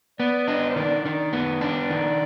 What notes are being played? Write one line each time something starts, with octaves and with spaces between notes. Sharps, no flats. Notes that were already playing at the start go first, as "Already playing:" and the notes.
B3 D5
D4 D#5
C5
D#3 D5
D#3 D5
B3
D4 D5
D#3